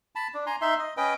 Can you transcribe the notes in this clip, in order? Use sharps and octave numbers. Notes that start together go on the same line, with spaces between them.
A5 B5
D4
G#5 A#5 C6
D#4 E5 C6
D#5
C#4 B4 D#5 G5